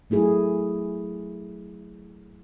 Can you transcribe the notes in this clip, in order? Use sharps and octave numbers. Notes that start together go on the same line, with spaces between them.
F#3 A3 E4 G#4